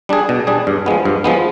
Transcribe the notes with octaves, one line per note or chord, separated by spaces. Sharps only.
G3 D4 G#4
B2
G3 D4 G#4
G2
F3 G#3 B3
G2
F3 G#3 B3